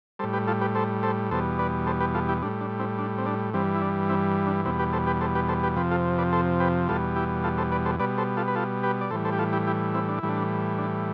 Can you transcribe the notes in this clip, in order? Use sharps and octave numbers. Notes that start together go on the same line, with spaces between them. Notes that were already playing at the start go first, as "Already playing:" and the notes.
A2 G3 A4 C5
G4 B4
F4 A4
G4 B4
A4 C5
A4 C5
E2 B2 G3 A4 C5
B4 D5
A4 C5
G4 B4
F4 A4
E4 G4
A2 G3 D4
D4
C4 E4
D4
C4
D4
G2 E3 G3 C4
E4
D4
C4 E4
D4
E2 B2 G3 C4 E4
G4 B4
A4 C5
G4 B4
A4 C5
G4 B4
A4 C5
G4 B4
F2 C3 F3 G4 B4
F4 A4
B4 D5
A4 C5
G4 B4
E2 B2 G3 F4 A4
E4 G4
F4 A4
A4 C5
B4 D5
A4 C5
B2 G3 B4 D5
A4 C5
F4 A4
B4
F4 A4
G4 B4
D5
A2 E3 G3 A4 C5
A4 C5
G4
F4 A4
E4 G4
E4 G4
C4 E4
D4
A2 E3 G3 E4
D4
D4